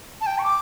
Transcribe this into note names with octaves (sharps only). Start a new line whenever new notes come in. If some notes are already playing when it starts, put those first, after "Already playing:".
A5
G5
C#6
D6